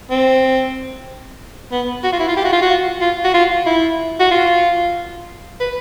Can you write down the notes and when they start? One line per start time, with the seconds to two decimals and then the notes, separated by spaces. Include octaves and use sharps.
0.10 C4
1.72 B3
2.04 F#4
2.12 F4
2.20 E4
2.28 F4
2.37 G4
2.45 F#4
2.53 F4
2.62 F#4
3.01 F4
3.24 F#4
3.34 F4
3.66 E4
4.20 F#4
4.31 F4
5.61 B4